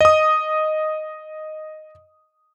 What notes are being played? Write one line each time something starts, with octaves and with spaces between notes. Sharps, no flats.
D#5 D#6